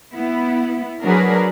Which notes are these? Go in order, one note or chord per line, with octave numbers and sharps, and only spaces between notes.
B3 E4
F#3 D4 F#4 G#4 A#4 B4